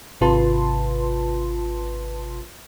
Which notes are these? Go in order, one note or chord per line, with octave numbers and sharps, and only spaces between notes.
G#1 C3 F4 B4 A5 C6